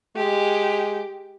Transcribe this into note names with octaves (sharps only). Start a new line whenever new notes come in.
G#3 G4